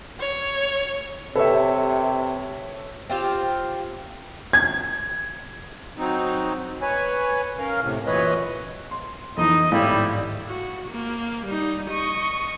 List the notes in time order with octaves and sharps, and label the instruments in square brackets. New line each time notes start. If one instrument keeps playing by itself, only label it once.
[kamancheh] C#5
[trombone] C3 [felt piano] G4 B4 [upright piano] A4 C#5 E5
[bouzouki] C4 F4 G4
[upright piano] G#6
[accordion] F#3 C4 D#4
B4 C#5 G#5
C#4 A#4 F5
A2 C3
F#2 A#2 E3 B4 C#5 D#5
[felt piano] C6
[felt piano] F2 E3 [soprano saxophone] D#4 [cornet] D#5
[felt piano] G#1 A2 [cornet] G3 [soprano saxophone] E4
[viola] F#4
A#3
G3 D#4
D#5 C#6